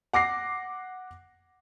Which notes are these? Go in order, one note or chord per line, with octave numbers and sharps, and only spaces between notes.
F#5 D6 A#6 C7